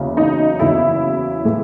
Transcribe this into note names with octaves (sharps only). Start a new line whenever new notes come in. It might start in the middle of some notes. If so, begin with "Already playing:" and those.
Already playing: F#1 E2 C#3 F#3
D#4
F#1 E2 C#3 F#3 E4
A2 E3 G#3